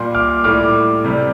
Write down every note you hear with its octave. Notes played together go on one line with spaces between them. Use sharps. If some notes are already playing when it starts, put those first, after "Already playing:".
Already playing: A#2 G3 C6
D6 F6
A2 G3 D6 F6
C3 G3